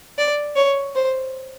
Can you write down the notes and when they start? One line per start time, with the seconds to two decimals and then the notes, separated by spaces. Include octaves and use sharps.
0.18 D5
0.56 C#5
0.95 C5